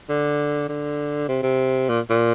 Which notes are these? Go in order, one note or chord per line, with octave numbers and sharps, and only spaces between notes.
D3
D3
C3
C3
A#2
A#2